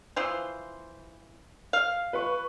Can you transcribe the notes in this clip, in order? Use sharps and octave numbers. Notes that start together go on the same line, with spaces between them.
E3 F3 C5
F5
B4 C#6